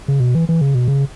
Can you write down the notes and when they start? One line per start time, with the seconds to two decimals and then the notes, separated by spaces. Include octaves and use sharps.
0.08 C#3
0.20 B2
0.35 E3
0.49 E3
0.61 C#3
0.75 B2
0.88 C#3